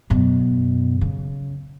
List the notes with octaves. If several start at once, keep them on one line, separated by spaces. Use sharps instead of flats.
F#2 B2
C#3